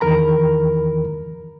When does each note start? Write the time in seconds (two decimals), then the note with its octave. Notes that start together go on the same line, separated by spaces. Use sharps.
0.01 E2 D#3 E3 A#4 A#5 B5